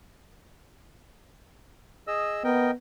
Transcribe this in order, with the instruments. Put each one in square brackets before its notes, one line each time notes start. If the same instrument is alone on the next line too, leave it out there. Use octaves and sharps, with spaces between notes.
[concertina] G#4 D#5 E6
[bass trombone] B3 [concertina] A#4 D#5 G5